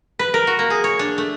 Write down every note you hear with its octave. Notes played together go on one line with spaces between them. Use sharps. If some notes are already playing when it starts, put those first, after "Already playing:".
B4
A#4
F#4
A#3
G#4
C#5
D4
A3